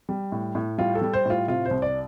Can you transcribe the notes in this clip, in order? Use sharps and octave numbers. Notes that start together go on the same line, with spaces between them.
G3
A2
A2
G3 F4
A4
G3
C5
A2 F4
C3 F4
C5
C2
D5